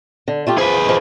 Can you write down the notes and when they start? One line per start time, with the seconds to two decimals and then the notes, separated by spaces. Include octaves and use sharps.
0.28 D3
0.47 A3 F4 G4
0.58 F3 G#4 B4
0.85 D#3 F3